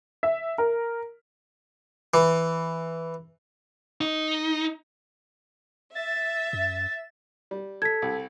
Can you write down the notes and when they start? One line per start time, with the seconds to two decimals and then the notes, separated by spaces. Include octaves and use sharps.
0.23 E5
0.58 A#4
2.14 E3
4.01 D#4
5.95 E5 A6
6.53 F#2
7.51 G3
7.82 A4 G#6 B6
8.02 C2